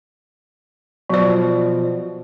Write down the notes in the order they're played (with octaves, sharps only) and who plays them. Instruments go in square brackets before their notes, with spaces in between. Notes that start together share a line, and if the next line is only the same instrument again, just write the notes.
[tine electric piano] B2 F3 [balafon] F#3 D5